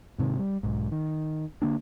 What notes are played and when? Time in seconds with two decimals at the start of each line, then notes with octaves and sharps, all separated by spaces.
0.18 G#2 C3 D#3
0.39 G3
0.63 B1 G#2
0.92 D#3
1.62 D3 A#3 D4